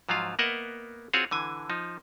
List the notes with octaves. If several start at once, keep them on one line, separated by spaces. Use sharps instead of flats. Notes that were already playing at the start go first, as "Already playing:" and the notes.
G#2 F3 F#3 F4 F5
A#3 B3 A#4 D#5 E5 F#5
C4 F4 F#4 G#4 C#5
D3 E3 G#5
F3 D#4